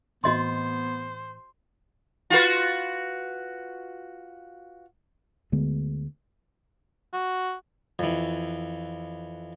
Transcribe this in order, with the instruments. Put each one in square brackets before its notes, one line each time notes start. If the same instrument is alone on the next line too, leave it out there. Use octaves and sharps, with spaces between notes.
[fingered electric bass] A2 E3 C4 [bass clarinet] B3 [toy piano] F#4 D#5 C6 [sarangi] C5
[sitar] F4 F#4 B4
[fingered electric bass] D2 D3 G#3 B3
[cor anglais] F#4
[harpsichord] F2 E3